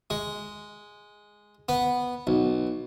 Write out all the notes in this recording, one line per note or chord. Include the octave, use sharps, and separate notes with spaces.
G#3
B3
B1